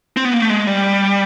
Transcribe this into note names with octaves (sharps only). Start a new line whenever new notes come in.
C4
B3
A#3
A3
G#3
G3